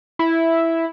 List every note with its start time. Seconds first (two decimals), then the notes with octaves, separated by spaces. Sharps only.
0.19 E4